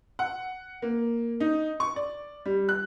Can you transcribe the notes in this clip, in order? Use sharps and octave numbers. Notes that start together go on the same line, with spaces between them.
F#5
A#3
D#4
C#6
D5
G3
F#6